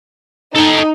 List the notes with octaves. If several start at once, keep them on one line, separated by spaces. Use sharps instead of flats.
D#4 A4 G5